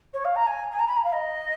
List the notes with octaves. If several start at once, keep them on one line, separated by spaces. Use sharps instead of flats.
C#5
F5
A#5
G#5
G#5
A#5
B5
A#5
F5
D#5